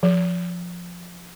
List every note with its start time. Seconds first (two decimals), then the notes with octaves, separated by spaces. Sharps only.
0.03 F3